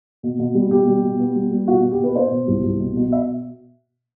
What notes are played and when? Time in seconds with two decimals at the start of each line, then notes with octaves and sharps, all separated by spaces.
0.23 B2
0.39 B2
0.55 G3
0.71 B2 G4
0.87 G3
1.04 B2
1.19 B3
1.35 G3
1.51 G3
1.68 B2 F#4
1.84 B3
1.91 G4
2.00 B2 B4
2.15 B2 C5
2.32 B2
2.48 C2
2.63 C2
2.80 B2
2.96 B2
3.12 E5